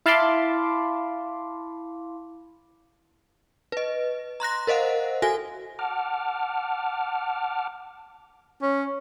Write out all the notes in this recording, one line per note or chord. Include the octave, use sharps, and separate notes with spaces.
E4 F5 A5 B5 C6 D6
B4 D#5
A#5 C6 F#6 A#6
A#4 C5 D#5 F5 F#5
F#4 A4 G#5 A#6
F#5 A5 D6 F6
C#4